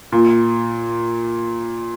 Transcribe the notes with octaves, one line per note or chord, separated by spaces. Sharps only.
A#2